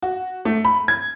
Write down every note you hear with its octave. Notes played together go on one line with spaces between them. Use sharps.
F#4
A3
B5
G#6